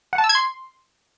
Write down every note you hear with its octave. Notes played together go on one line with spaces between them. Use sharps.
F#5
A5
E6
G#6
C6